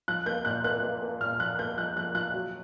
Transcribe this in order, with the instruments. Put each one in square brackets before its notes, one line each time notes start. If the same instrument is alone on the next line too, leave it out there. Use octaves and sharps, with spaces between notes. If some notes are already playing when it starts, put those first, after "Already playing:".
[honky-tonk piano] F3 F#6
A#3 G6
A#2 F#6
A#3 F#6
A#3
A#3
A#2 F6
F3 F#6
A#3 G6
F3 F#6
F3 F#6
F3 F#6
F#3